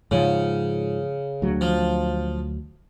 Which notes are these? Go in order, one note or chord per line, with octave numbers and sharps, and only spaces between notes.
G#2 C#3 F3
D2 F#3
F3